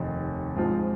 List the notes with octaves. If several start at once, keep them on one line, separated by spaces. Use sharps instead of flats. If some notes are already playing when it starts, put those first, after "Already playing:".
Already playing: F1 D#2 D#3
G#2 F3 C4 F4